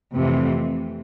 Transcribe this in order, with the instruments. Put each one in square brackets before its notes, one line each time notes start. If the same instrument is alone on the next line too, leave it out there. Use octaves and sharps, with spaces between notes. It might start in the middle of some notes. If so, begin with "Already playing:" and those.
[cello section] F2 C3 E3 A3